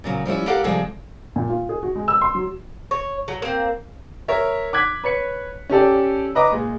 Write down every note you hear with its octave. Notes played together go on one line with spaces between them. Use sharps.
A#2 C#3 F#3
F3 G3 C#4 E4
G4 A4 A#4 D5 F5 F#5
C3 F3 G3 G#3 G#4 A4
A#2
F4
G#4
F#4
G#3
E6
C6
F#3
C#5
F#3
A#3 C4
A#4 C#5 E5
D6 F#6 G#6 B6
B4 C#5 C#7
C#4 G4 A4 D5
B4 D#5 A#5 D6
A#2 G#3